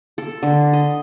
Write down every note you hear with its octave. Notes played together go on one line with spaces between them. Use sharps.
A4
D3
D#5